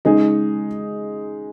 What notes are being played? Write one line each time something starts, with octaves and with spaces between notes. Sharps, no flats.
C#3 G#3 D#4 G#4